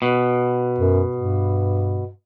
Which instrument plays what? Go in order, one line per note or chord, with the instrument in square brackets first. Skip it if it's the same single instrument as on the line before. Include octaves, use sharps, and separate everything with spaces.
[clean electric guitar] B2
[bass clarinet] F#2
G2